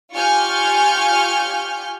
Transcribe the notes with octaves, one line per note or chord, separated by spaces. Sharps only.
F4 G4 G#5 C#6 F6 G6